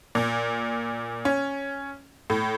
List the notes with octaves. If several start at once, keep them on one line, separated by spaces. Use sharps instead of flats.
A#2
C#4
A2